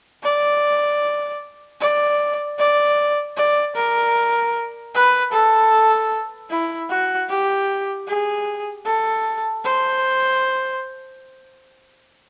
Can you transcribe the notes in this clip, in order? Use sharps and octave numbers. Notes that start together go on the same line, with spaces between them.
D5
D5
D5
D5
A#4
B4
A4
E4
F#4
G4
G#4
A4
C5